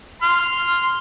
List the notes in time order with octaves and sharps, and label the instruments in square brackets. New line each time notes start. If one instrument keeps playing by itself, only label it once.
[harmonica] C6 F6